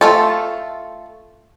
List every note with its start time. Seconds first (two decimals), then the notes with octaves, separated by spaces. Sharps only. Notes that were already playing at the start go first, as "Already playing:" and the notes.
0.01 A3 F4 A4